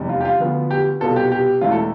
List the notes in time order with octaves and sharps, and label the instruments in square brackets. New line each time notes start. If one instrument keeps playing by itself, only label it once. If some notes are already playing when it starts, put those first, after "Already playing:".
Already playing: [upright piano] F1 E2 C3 G3
[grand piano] F4
G4
F4
[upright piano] D2 D3 F3 B3 F4
[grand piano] G4
[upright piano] C2 B2 B3 F4 [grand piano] A4
[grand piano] G4
G4
[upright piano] E1 E2 B2 A3 E4 [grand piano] F4
[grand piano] A4